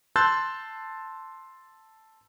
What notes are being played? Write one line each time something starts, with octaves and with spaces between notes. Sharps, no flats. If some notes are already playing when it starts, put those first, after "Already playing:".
A5 C6 E6 F#6 G6 A6